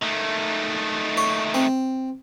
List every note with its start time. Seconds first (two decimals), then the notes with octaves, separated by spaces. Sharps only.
0.03 D#3 A3
1.17 C#5
1.54 C4